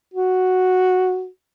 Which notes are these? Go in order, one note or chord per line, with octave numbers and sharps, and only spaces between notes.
F#4